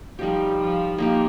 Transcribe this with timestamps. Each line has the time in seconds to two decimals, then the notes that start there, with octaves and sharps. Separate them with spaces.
0.19 F3 G3 D#4 G4
0.59 F3
0.98 F3 A#3 D#4 G4